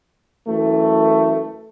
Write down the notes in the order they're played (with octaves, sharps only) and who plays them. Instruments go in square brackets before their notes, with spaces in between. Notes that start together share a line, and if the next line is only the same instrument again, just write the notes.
[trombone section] F#2 E3 A3